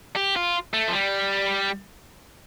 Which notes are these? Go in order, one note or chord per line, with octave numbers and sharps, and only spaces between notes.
G4
F4
A3
F3
G3